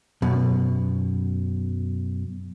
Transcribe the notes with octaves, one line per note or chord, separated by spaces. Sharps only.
F#2 B2